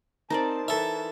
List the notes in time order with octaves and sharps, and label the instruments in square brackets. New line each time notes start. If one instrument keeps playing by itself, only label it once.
[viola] C4 A5 [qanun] D#4 C5 D5 [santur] A#4
[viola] E3 A5 [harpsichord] A4 E5